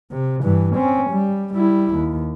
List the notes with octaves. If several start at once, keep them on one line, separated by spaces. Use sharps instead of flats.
C3
G2 E3
C4 C#4
G3
G3 E4
D#2